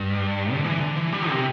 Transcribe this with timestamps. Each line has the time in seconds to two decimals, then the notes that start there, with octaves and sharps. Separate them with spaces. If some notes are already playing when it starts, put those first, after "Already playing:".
Already playing: G2
0.53 D3
0.64 E3
0.80 D3
0.97 E3
1.12 G3
1.30 C3